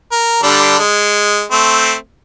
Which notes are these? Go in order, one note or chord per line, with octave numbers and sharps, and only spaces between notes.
A#4
D3 G3 D4
G#3
A3 C4